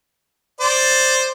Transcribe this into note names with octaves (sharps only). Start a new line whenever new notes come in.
C5 D5